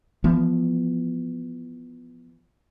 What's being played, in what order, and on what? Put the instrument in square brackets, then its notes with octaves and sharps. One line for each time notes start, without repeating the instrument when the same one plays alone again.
[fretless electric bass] E3 F3 B3